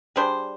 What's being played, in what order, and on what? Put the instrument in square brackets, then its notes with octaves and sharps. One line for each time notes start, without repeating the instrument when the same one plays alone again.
[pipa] G3 D4 G#4 C5